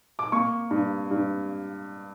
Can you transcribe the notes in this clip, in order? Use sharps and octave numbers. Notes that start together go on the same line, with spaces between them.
D6
A#3 C#6
G2
G2